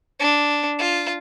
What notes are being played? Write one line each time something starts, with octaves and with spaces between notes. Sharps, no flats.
D4
F4